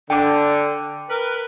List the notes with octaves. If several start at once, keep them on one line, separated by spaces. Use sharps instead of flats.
D3 G5 D6
A#4 B4